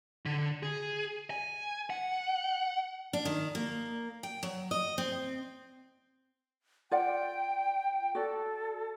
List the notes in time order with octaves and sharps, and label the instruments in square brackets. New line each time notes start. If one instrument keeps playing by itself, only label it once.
[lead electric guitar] D3
G#4
G#5
F#5
[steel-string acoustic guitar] D4
D#3
A#3
G5
F#3
D#5
C4
[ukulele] F4 D5 F#5 [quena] G5
[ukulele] F#4 D5 [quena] A4